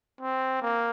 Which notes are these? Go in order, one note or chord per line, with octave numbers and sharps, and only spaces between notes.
C4
A#3